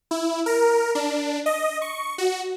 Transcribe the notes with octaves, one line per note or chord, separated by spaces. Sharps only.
E4
A#4
D4
D#5
C#6
F#4